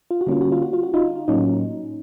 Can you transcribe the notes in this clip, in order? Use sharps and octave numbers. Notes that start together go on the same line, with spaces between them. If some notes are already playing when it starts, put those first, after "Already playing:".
F4
F#4
D3 G3 A#3 C#4 F4
F#4
F4
F#4
F4
F#4
D#4 F4
A2 F#3 A#3 C#4 D#4